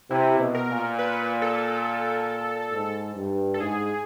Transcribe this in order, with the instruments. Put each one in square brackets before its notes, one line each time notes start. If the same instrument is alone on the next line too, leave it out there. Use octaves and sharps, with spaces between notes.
[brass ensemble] C3 [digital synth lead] E4
[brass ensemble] B2
[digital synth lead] A#4
[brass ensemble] A#2
[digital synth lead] B4
A4
[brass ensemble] G#2
G2
[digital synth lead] A4
[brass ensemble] G#2 [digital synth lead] G#4